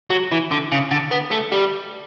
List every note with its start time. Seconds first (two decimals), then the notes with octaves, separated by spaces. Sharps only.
0.10 F#3
0.32 E3
0.51 D3
0.72 C#3
0.91 D3
1.11 B3
1.31 A3
1.52 G3